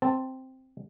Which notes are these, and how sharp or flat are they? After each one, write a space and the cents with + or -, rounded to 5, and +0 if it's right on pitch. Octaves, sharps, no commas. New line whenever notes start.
C4 +0 A5 +5